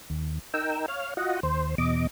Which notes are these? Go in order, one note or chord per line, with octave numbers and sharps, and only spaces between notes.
D#2
D#4 A#4 G5 E6
C#5 F5 F6
F4 F#4 D#5 F#5
D#2 C5
E2 B2 D#5 D6